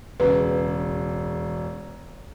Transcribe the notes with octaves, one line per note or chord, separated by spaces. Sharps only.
E1 C#3 B4